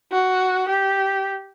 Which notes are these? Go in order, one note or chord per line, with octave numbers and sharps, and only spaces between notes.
F#4
G4